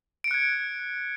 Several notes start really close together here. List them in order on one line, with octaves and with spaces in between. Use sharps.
D7 C#7 F#6 G#6